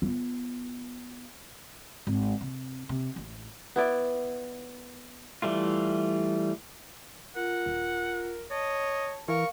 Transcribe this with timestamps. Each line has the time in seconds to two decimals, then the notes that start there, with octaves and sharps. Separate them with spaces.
0.02 B3 F4
2.07 G#1
2.41 C3
2.89 C3
3.16 A1
3.76 B3 E4 D5
5.42 E3 G3 A3 F4
7.36 F4 A#4 F#5
7.66 D#1
8.51 C#5 D#5 A5
9.28 E3 A#4 F5 C#6